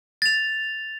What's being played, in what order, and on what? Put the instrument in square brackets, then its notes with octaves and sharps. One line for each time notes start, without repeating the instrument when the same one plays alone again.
[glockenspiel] A6 F7